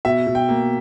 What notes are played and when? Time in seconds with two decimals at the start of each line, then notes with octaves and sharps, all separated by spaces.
0.05 B2 E5
0.27 B2
0.35 G5
0.49 A#3